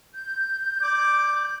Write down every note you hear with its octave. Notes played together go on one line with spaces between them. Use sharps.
G6
D5 D6